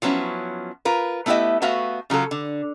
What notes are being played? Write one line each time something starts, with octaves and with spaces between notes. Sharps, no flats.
F3 F#3 B3 C#4 E4
F4 A#4 B4
A3 B3 E4 G4 D#5 E5
A3 B3 F#4 E5 F5
C#3 F#3 F4 A4
D3